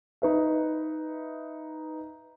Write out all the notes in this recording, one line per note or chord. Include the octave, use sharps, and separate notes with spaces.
D#4 B4 E5